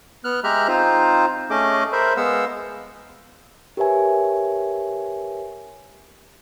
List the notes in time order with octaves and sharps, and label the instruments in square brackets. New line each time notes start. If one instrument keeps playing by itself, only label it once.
[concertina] B3 F6 F#6
G#3 G4 E5 A#5 F6 F#6
C4 D#4 F4 C5
A3 C#4 G#4 D#5 D6
A#4 C5 E5 B5
G#3 B3 F5 F#5 E6
[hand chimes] G4 A#4 B4 C#5 E5 G#5